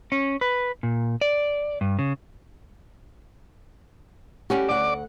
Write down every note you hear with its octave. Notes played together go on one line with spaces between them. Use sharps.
C#4
B4
A#2
D5
G2
C#3
G3 C#4 F#4 G4
D2 D5 F#5 D6